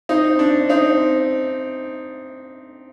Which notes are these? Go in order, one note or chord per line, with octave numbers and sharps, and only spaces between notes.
C4 D#4
D4
C4 D#4